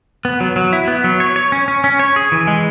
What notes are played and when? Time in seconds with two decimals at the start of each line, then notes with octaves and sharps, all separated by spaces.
0.25 B3
0.40 F#3
0.56 F#3
0.73 E4
0.88 B3
1.04 F#3
1.20 C#5
1.36 C#5
1.52 C#4
1.68 C#4
1.84 C#4
1.99 C#5
2.16 G#4
2.32 E3
2.47 G#3